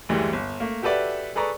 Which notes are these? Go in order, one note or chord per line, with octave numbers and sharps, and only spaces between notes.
F#1 D2 E3 G3 G#3 G4
G1
A3 A#3
F#4 G4 A4 B4 D5 E5
G#4 A4 B4 D5 A#5 C#6